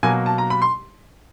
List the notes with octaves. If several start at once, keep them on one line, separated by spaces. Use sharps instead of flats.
B2 F#3 A#3 G#5
A5
A#5
B5
C6